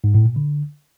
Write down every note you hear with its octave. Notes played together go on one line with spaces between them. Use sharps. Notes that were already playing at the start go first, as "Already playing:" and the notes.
G#2
A2
A#2
D3